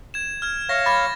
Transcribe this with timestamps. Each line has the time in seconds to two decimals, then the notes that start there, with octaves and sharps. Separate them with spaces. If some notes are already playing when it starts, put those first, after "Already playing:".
0.14 G#6 E7
0.42 F6 G#6
0.69 C#5 E5 F5 A#6
0.86 B5 D6 A6